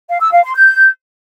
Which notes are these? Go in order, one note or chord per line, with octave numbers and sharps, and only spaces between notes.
F5
E6
F5
C6
G6